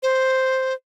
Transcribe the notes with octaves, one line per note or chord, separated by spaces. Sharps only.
C5